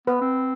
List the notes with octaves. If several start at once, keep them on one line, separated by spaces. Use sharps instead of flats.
B3 B4
C4